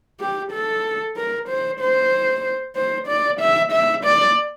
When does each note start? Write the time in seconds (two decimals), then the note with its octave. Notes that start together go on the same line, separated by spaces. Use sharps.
0.20 G4
0.52 A4
1.17 A#4
1.49 C5
1.80 C5
2.76 C5
3.08 D5
3.40 E5
3.72 E5
4.04 D5